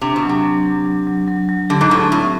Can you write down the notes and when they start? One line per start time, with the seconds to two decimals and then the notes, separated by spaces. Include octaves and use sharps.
0.01 C3 D4
0.16 B2
0.23 F#3
0.29 C3
0.44 F#3
0.65 F#3
0.86 F#3
1.07 F#3
1.28 F#3
1.49 F#3
1.69 D3 G4
1.81 G#2
1.91 A2 G4
2.12 A2 C4